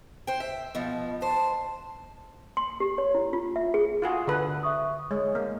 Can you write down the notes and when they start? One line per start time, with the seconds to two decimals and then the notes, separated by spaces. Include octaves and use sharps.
0.27 C5 G5
0.40 E5
0.75 B2 F3
1.22 C5 A5
2.57 C6
2.80 G4
2.98 C#5
3.15 E4
3.33 F4
3.56 E5
3.74 G#4
4.02 F4 F#4 G#4
4.27 D3 A4 B4
4.63 E5 C#6 D#6
5.11 G#3 C#5
5.35 A#3